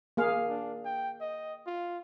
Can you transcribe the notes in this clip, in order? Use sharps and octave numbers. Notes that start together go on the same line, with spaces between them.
A#3 G#4 F5
D4
G5
D#5
F4